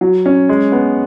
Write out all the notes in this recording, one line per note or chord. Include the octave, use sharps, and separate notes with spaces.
F#3
C#4
G#3
B3